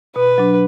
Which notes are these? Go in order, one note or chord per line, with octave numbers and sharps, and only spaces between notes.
B2 B4
F#3 D4